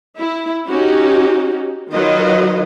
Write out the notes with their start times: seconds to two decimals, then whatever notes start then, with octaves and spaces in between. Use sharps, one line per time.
0.18 E4
0.67 C#4 D#4 F#4 G4
1.93 D#3 F#3 D#4 F4 B4 D#5